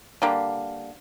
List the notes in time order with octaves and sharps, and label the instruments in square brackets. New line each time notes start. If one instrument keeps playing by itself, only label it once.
[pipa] D3 G3 A#3